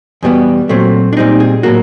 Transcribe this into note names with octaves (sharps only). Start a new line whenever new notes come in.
E2 B2 G3 B3
A#2 F#3 A3 C4
D4
A#2 G3 C4 D#4
G#4
A2 F#3 A#3 F#4